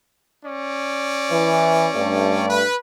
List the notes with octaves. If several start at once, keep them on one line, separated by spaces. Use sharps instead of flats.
C#4 D5
E3
G2 A3
B4